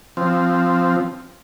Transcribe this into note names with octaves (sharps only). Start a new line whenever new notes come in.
F3 C4